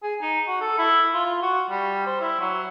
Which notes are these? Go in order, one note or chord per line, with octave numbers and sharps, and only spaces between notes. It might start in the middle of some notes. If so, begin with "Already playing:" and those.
G#4
D#4
F#4
A4
E4
F4
F4
F#4
G3
C5
E4
F#3